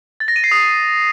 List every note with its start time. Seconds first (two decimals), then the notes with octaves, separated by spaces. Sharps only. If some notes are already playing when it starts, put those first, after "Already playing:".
0.20 A6
0.28 A#6
0.36 D#7
0.44 C7
0.51 D#6